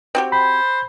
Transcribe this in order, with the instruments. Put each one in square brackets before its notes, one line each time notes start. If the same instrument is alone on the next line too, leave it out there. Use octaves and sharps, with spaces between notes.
[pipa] C4 F#4 G4
[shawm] C5 [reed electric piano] B5